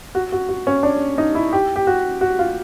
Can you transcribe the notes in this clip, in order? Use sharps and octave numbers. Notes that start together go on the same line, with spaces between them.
F#4
F#4
F#4
C#4
D4
D#4
E4
G4
G4
F#4
F#4
F4